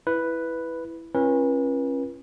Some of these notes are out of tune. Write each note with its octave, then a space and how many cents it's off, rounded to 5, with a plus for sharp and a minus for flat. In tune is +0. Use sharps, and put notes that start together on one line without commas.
E4 +0 B4 +0
C#4 -30 F4 -45 B4 -35